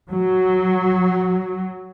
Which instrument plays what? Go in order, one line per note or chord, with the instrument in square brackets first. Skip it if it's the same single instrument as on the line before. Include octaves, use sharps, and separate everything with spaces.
[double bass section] F#3